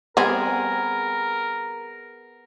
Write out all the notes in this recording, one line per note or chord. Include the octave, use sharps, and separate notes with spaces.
G3 B3 C4 G#4 A#4 G#5